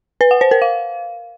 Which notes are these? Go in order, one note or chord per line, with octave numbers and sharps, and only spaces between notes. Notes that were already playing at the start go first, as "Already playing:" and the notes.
B4
F#5
C5
A#4
F5